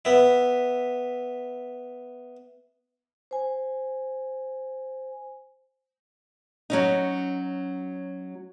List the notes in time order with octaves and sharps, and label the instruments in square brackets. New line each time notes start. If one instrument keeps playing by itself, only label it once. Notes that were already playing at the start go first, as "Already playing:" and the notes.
[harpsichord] B3 E4
[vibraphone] C5 G#5
[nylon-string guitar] F#3 C#4 D#4